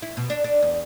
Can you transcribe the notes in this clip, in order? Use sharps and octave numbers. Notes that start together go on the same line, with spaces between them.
E4
B2
D4
D4
E2